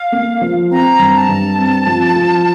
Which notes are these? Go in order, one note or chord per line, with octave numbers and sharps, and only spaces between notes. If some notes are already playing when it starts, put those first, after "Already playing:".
Already playing: F5
A#3
F3
C4 A#5
G2
A5
G2
C4
F3
F3